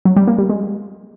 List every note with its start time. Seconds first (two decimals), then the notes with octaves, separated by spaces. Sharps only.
0.05 F#3
0.16 G3
0.27 A#3
0.38 G3
0.49 G#3